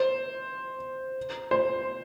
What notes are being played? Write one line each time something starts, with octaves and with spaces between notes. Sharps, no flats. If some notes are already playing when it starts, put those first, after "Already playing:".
Already playing: C5
C5